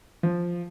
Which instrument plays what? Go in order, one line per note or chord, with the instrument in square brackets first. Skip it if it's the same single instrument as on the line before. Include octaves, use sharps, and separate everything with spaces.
[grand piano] F3